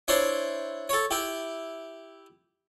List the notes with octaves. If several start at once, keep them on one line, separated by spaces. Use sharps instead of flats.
D4 E4 C5 C#5
A4 C#5
E4 G4